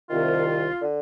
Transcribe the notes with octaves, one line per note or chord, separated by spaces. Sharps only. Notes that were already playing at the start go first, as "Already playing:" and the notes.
C2 C3 D#3 F4
D3